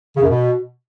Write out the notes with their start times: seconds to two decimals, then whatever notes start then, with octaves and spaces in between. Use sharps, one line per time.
0.16 C#3
0.22 F#2
0.29 B2